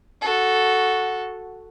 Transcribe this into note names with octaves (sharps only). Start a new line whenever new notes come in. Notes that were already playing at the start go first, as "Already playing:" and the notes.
F#4 A4